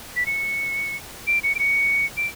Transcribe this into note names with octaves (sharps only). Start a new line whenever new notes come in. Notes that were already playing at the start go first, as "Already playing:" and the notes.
B6
C#7
D7
C#7
D7
C#7
D7